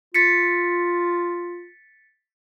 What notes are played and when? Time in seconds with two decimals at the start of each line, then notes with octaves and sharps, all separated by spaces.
0.14 F4 A6 B6 C#7